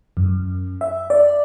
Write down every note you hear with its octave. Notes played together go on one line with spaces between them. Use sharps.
F#2
E5
D5